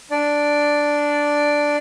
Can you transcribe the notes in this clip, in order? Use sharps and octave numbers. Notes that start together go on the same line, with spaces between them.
D4 D5